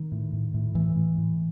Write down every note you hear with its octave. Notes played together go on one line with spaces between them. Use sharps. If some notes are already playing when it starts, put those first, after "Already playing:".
Already playing: D#3
A2
A2
A2
A2 E3
A2
A2